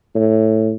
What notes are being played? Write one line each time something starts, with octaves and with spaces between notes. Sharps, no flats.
A2